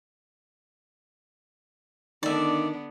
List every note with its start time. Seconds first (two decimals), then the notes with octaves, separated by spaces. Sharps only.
2.23 D3 D#3 B3 D4 D5 E5